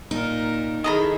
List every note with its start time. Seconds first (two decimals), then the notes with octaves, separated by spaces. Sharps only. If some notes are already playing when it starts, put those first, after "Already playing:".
0.11 A#2 D#4 A#4
0.84 D#3 E4 G#4 A4 D#5 A#5 B5